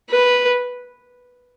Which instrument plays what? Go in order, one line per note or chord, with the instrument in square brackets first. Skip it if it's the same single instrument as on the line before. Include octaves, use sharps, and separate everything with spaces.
[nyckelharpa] B4